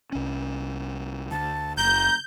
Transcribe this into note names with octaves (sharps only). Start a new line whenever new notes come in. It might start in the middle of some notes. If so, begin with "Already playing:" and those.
C2 C#4
D2 A5
F#1 A#5 G6